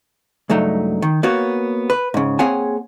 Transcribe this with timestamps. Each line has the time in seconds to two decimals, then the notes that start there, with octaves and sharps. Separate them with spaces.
0.50 C#2 G2 F#3 A3 D#4
1.02 D#3
1.23 A#3 B3 F#4 C#5
1.90 B4
2.14 G#2 C#3
2.39 A#3 C4 G#4 C#5 F#5 G#5